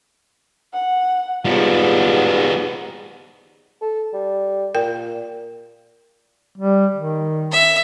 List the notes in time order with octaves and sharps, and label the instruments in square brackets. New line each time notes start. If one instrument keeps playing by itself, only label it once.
[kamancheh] F#5
[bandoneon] E2 G#2 B2 [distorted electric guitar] G3 F4 [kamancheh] B3
[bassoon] A4
G3
[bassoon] A#2 [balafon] A#4 G5
[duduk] G3
D#3
[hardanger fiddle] E5